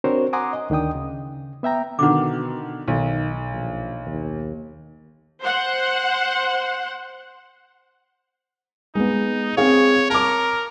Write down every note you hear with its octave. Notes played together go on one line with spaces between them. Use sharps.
C4 D4 F#4 A#4 C5 C#5
F#5 G#5 A#5 C6 D6 D#6
D#5
D2 D#3 D4 G5 D#6
C#3
B3 E5 G5 A#5
B2 D3 D#3 F#5 D6
B1 D#3
A#1
D#2
C5 F#5
G#3 B3 D#4
C4 G#4 C#5 F5
A#4 A5 A#5 D6